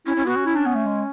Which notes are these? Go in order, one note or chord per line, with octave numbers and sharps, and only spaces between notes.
C#4 E4
C#4
B3 F#4
C#4
E4
D4
B3
A3
G#3